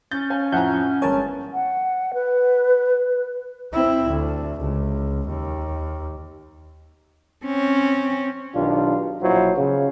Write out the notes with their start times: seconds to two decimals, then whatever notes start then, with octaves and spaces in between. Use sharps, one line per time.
0.11 C#4 G6 A6
0.30 C#5 F5 G#5
0.52 F2 A2 F3 E5 F#5 G#5 A#5 G6
1.02 G1 G#3 A#4 C#5 G#5 A5
1.53 F#5
2.14 B4
3.73 C4 E4
4.10 D2
4.61 C#2
5.28 D#2
7.46 C4 C#4
8.55 B1 B2 D#3 D4 F4 G4
9.23 A#1 B2 F#3 E4 F4 C5
9.57 C#3 F3